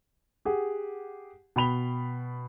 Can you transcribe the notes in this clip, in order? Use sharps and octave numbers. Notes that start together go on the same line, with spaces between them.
G4 G#4 F#5
B2 G5 B5 F7 G7